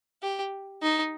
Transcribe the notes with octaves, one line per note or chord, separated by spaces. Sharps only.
G4
D#4